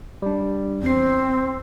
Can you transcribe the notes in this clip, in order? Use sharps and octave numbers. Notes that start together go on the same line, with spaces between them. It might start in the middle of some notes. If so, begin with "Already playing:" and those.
G3 D4
E2 C4 C7